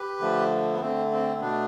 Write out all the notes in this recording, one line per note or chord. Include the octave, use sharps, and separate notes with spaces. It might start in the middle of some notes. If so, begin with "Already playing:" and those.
Already playing: G4 B4
D3 F3 A3
B3
D3 A3 C4
C4
B2 A3 B3 D4